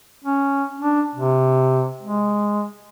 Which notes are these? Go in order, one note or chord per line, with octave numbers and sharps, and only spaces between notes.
C#4
D4
C3
G#3